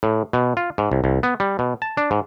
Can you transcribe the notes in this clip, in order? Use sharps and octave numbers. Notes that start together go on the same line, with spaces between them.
A2
B2
F4
G#2
C2
C2
B3
G3
B2
A5
D4
G#2